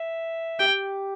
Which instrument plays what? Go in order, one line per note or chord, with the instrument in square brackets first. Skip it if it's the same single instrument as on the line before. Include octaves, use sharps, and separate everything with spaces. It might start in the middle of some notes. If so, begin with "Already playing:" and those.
Already playing: [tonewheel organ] E5
[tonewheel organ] G4 [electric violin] G5